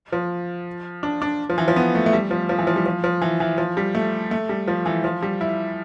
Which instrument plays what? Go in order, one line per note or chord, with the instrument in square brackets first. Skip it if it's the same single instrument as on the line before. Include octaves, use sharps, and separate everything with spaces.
[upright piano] F3
D4
D4
F3
E3
F3
B3
A3
A3
G3
F3
F3
E3
F3
G3
F3
F3
E3
E3
F3
G3
A3
A3
G3
F3
E3
F3
G3
E4